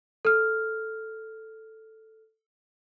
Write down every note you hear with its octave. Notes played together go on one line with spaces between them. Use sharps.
A4 F6